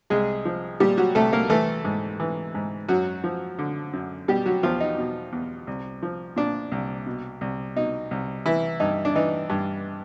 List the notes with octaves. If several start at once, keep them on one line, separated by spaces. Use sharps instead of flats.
C2 G#3 G#4
F3
A#2 G3 G4
F#3 F#4
C2 A3 A4
A#3 A#4
E3 A3 A4
G#2
E3
G#2
F#2 F#3 F#4
F3
D3
F#2
B2 G3 G4
F#3 F#4
E2 F3 F4
D#4
B2
E2
C2
F3
A#2 D4
C2
B2
C2
B2 D#4
C2
E3 E4
G2 D#4
D4
E3 D#4
G2